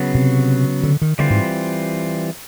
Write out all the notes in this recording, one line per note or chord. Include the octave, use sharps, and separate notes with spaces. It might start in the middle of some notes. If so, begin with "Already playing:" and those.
Already playing: C#3 F#3 B3
C3
D3
D#3
D3 E3 G3 C4 F4
G#2